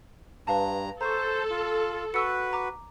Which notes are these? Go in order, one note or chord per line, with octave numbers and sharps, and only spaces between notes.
G2 B4 F5 A5 A#5
A4 C5 A#5 C#6
F4
F#4 B4 C#6 E6 C#7
A#5 D6